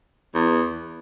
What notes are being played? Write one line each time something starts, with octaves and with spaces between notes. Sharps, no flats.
E2